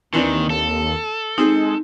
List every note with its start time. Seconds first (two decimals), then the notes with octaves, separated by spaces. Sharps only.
0.14 D#2 D#3 E3 C4 D4
0.50 A4
1.38 G#3 C4 D#4 G#4